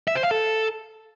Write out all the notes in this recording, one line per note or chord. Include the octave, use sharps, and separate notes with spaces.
E5
C5
F5
A4